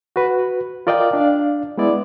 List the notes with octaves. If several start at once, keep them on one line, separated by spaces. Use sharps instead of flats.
F#4 B4
F4 A#4 D5 D#5 F5 G5
D4 D5 F5
G#3 B3 E4 D5